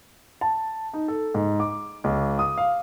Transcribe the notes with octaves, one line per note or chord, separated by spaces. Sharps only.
A5
D#4
A4
G#2
D6
C#2
D#6
F5